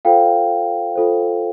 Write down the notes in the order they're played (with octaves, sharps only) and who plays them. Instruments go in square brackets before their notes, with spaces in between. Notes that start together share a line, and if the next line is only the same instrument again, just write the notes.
[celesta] F4 A4 C5 F5 G5
F4 A4 C5